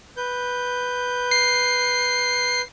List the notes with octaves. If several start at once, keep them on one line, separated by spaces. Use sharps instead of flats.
B4 G6
C7